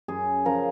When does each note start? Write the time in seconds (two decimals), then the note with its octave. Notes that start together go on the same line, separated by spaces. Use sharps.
0.08 F#2 G#4
0.45 C#3 F3 A#4